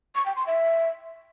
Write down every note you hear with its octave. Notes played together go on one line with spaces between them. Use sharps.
C#6
G5
C6
E5